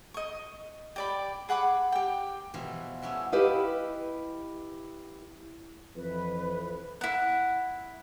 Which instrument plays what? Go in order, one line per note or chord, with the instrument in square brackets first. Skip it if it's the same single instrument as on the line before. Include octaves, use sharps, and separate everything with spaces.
[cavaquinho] D#5 C#6
G4 D5 B5
G#4 F#5 B5 D6
G4 G5
[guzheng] B2 E3 F3 B3 F4 F#4
G3 A3 B3 C#4 E4 F#4
[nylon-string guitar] E4 G4 B4 D#5 F5
[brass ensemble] F2 E3 [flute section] B4
[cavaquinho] E4 F#5